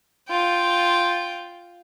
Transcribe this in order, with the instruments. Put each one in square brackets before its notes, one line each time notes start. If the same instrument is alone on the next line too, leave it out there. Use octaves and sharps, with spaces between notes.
[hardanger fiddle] F4 G5